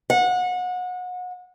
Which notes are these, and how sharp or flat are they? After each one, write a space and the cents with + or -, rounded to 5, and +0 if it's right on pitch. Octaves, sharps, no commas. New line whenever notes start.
F#5 -30